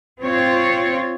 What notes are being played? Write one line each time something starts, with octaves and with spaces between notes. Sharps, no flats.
C4 F4 C#5